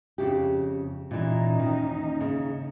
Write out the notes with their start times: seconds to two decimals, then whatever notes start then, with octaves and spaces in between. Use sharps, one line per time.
0.18 F2 C#3 G4
1.11 D#2 A#2 E3 C#4 D#4
1.60 D#3
2.21 C#3